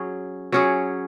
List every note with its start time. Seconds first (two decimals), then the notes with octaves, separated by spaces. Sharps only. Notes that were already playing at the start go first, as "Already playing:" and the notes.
Already playing: F#3 C#4 G#4
0.52 F#3 C#4 G#4